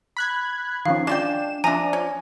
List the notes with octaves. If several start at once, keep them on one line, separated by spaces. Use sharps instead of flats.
B5 F#6 G#6
D#3 F3 C#4 F5
G#3 D4 F4 G5 E7
F3 D4 E5 G#5 A#5
C#4